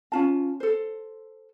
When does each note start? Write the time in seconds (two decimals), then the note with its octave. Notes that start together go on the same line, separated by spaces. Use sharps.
0.12 C#4 F4 A5
0.60 A4 C5